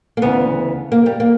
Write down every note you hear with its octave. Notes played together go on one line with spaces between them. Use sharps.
A#3
D2 C#3 E3 B3
A#3
G3
A#3